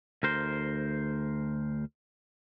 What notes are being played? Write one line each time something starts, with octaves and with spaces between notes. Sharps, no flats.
D2 A#4 C5